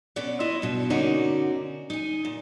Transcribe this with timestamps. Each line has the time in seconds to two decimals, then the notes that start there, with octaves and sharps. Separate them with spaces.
0.16 B2 B3 C#4 D5 F#5
0.40 E4 F4 D#5
0.62 G2 B2
0.90 D3 A#3 C#4 D#4 F#4 D5
1.90 D#4 G#5
2.25 A#2